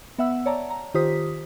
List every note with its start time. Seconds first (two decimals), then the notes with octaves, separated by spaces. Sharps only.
0.18 B3 E5 F#5 E6
0.46 C#5 D5 A5 A#5
0.70 A#5
0.94 D#3 F4 G4 C5 D#6 B6